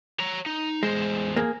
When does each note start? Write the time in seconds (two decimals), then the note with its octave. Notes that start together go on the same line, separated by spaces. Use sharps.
0.20 C#5 A#5
0.46 D#4
0.83 E2 G#3 C5
1.36 A#3 G#4